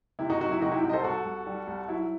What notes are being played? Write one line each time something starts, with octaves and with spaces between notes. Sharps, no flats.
C3 E4
D#4 F#4
F#3 D#4 F#4
E4
C3 D#4 F#4
E4 G4
C2
D#5
A4 C5
C2 F#4 A4
C2
G3
C2
F#3 E4